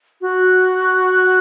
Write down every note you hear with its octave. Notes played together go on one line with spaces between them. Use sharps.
F#4